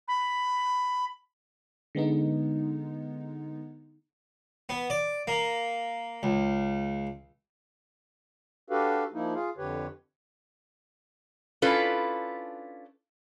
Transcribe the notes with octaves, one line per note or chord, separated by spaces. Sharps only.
B5
D3 G#3 B3 D#4
B3
D5
A#3
C#2
D4 F#4 G4 A4 B4 F5
F3 A#3 D#4 E4
F4 G#4 F5
F2 D3 G4 B4 C#5
C#4 D4 E4 F4 A4 B4